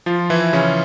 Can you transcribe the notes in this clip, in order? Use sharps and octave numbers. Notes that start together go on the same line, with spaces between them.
F3 F4
E3 E4
C#3 C#4